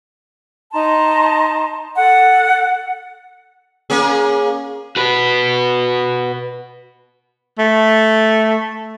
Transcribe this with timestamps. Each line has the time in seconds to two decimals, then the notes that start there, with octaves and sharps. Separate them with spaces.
0.73 D#4 A5 A#5 C6
1.95 A4 F#5
3.90 A#3 C#4 G#4
4.96 F#4 B4
7.59 A3